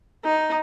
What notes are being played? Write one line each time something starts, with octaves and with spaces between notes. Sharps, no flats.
D#4